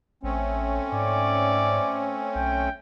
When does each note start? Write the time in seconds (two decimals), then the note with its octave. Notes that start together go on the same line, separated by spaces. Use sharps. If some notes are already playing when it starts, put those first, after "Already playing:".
0.23 A1 A3 C4 C#4
0.92 G#2 D5
2.35 B1 G5